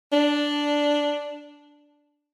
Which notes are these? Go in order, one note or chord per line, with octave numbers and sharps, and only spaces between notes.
D4